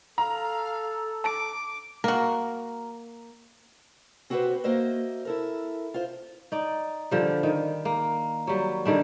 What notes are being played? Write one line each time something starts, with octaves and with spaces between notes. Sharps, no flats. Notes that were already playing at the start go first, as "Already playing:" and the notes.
A4 F5 A#5
A5 D6 D7
A#3 F#4 A#4
C4 F#4 G4 A4 B4 C5
A#3 F#4 C5 D#5 E5
E4 A4 A#4
F4 C5
D#4 D5
D3 F3 G3
D#3
A#3
F#3 G3
D3 D#3 G3 D4